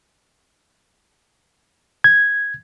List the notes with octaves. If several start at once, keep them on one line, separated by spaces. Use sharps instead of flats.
G#6